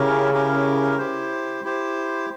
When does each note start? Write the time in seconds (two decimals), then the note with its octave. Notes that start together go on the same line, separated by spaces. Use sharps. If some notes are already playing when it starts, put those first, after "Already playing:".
Already playing: C#3 C#4 E4 G4 A#4
0.33 C#4 E4 G4 A#4
0.98 E4 G4 C5
1.64 E4 G4 C5